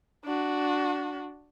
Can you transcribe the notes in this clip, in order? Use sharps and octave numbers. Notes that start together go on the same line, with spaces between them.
D4 F#4